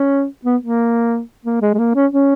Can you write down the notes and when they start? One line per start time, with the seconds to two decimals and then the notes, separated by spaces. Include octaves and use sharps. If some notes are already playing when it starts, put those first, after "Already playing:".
Already playing: C#4
0.45 B3
0.62 A#3
1.45 A#3
1.62 G#3
1.74 G#3
1.79 A#3
1.95 C#4
2.12 C#4